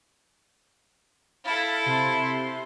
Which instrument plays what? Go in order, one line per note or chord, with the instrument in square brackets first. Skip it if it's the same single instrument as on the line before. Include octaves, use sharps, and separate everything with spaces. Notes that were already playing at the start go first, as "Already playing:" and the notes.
[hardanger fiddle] E4 A4 [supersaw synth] F5 A5
[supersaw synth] C3 C6